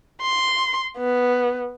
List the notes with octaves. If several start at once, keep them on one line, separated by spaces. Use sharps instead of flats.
C6
B3